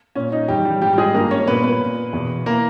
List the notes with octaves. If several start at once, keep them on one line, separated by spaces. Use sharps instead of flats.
A#2 C#4
D#4
E2 D#3 G3 G4
G3 G4
G#2 D#3 G3 G4
G4
G#3 G#4
G2 D#3 A#3 A#4
C#4 C#5
A#2 B3 B4
B3 B4
A#2
E2 B2
E3 A#3 A#4